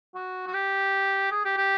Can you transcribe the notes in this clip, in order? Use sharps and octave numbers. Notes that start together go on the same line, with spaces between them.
F#4
F#4
G4
G#4
G4
G4